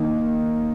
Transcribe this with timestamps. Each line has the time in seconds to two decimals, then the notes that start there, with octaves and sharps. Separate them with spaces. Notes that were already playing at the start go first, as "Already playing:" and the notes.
Already playing: D#3 A#3 D#4